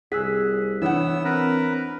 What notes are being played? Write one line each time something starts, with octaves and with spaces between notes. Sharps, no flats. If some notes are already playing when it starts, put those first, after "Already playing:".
C2 G#4 E6 F#6 B6
E3 B3 D4 C#5 F#5 E6
C4 A#4 B4